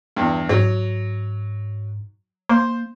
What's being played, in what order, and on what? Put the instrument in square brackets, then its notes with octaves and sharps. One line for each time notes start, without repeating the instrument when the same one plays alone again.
[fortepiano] E2 G2
[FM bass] G#2 [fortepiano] F#3
[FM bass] A#3 [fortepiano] C5